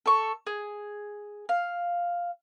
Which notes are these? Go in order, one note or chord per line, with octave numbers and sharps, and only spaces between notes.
A4 C#6
G#4
F5